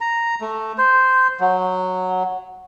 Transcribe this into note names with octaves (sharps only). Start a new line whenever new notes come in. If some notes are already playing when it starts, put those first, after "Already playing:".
A#5
A3
C5
F#3